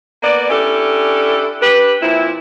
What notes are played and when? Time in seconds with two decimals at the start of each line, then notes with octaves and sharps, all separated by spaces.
0.23 A#3 B3 D5
0.50 C#4 D4 E4 G4 A4
1.61 D4 G4 B4
2.02 A#2 F3 C4 E4